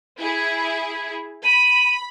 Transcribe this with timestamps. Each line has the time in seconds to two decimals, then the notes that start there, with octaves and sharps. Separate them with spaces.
0.20 E4 G#4
1.45 B5 D#7